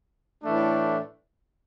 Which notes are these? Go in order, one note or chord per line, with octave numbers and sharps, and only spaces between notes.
A2 E3 A3 D4